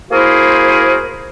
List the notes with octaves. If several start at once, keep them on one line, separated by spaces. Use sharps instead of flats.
A#3 E4 F#4 G#4 A#4 C5